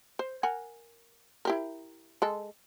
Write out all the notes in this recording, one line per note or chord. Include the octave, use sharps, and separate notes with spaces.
C5
A#4 F#5 G#5
E4 G4 A#4
G#3 A4